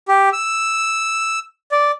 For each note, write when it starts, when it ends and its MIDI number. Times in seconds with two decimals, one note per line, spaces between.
0.08 0.29 67
0.33 1.39 88
1.72 1.91 74